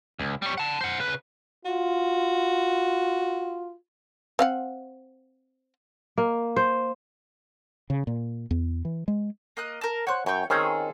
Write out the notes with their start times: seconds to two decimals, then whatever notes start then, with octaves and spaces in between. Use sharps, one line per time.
0.19 C#2
0.42 G3 C#5
0.58 F#5 A5
0.81 C5 F#5
0.99 C#3 B4
1.65 F4 F#4
4.39 C4 F5 F#5
6.18 A#3
6.56 C5
7.90 C#3
8.07 A#2
8.51 E2
8.85 E3
9.08 G#3
9.57 A#3 D#5 F#6
9.81 A#4 A5
10.07 C5 C#5 F#5 F#6
10.26 F#2 C#5 G5
10.50 D#3 C4 C#4 F4 G#4 A4